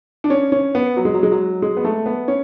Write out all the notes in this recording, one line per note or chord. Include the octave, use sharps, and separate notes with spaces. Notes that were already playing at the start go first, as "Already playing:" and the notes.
D4
C#4
C#4
B3
F#3
G#3
F#3
G#3
F#3
G#3
B3
A3
B3
C#4